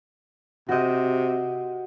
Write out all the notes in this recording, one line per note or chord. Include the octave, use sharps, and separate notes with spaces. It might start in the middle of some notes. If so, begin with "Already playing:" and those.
C3 F#4 D#5